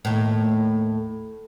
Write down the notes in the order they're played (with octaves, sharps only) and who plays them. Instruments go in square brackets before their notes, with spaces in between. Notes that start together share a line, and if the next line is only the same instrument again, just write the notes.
[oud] D#2 A2